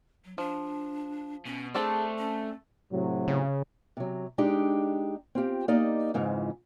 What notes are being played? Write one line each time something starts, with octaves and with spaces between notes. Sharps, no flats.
F#3
F3 D4
B2 C#4
A3 C4 D4 G#4 A4
C#4
A2 C3 F#3
C#3
C3 F#3
G#3 D4 D#4 G4
C4 F4 G4
A#3 D#4 G4 D5 D#5
F2 G#2 C#3 E3 F3